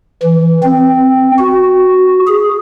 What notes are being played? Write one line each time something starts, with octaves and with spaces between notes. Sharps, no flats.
E3
C4
F#4
G#4